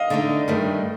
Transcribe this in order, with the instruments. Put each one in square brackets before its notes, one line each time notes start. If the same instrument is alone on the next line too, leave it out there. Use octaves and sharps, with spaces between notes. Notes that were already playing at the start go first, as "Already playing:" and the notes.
Already playing: [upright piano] D#5 F5
[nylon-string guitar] D3 A3 D#4
G2 D#3 A3